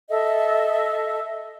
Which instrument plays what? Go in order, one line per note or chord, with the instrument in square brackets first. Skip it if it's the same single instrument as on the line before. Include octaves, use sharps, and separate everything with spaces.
[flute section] A4 D#5 E5